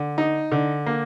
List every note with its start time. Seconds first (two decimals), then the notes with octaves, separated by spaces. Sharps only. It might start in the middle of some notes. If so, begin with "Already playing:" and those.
Already playing: D3
0.18 D#4
0.52 D3
0.86 A#3